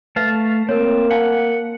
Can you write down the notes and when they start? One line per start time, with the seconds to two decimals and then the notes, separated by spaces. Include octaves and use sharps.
0.16 A3 B4 E5 F5 A5
0.69 A#3 C4 A#4 C#5
1.11 F5 F#5 G#5 A5